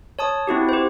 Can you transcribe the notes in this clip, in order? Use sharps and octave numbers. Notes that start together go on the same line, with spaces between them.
C#5 A5 D#6
C4 E4 F#4 G4
G4 C5